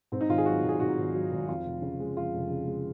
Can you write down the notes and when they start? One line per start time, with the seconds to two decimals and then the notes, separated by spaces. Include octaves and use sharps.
0.12 G#2 C4
0.21 D#4
0.29 G#1 F4
0.38 G#4
0.46 F#3 F#4
0.63 G#1
0.69 G#4
0.80 G#2 F#4
0.98 G#1
1.14 F#3
1.31 G#1
1.48 F2 F4
1.65 F1
1.82 C#3
2.00 G#3
2.17 F2 F4
2.33 F1
2.50 C#3
2.67 G#3